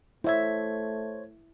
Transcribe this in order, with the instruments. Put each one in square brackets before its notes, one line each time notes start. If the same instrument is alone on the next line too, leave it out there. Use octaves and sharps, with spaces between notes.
[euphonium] A3 [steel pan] E4 E5 [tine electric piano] C5 C#5 G#6